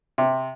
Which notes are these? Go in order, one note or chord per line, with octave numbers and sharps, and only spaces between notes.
C3